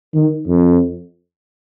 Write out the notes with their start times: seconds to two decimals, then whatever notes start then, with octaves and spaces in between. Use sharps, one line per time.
0.14 D#3
0.47 F2